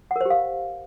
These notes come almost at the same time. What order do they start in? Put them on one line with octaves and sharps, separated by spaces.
F#5 A#4 C5 G4 F5